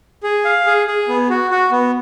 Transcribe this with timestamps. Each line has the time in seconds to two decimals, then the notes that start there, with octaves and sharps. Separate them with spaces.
0.23 G#4
0.45 F5
0.66 G#4
0.87 G#4
1.08 B3
1.30 F#4
1.51 F#4
1.72 B3